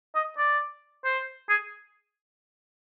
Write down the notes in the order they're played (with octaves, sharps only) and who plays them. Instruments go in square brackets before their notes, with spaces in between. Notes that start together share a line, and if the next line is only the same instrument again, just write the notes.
[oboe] D#5
D5
C5
G#4